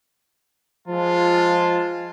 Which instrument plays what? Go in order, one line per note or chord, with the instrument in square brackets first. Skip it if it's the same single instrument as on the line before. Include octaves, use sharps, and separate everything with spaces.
[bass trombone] F3 [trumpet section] G#3 A5 [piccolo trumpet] F4